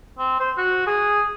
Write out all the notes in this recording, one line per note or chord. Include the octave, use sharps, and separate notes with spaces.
C4
C5
F#4
G#4